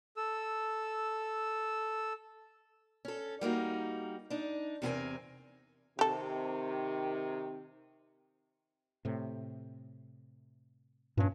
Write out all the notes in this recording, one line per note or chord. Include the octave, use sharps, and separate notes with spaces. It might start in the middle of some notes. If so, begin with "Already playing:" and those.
A4 E6
C#4 A4
G3 A#3 D#4 F#4
D4 D#4
E2 C3 C4 G4 A#4 G#5
C3 D#3 G4 A4
A2 C3
G2 A#2 C#4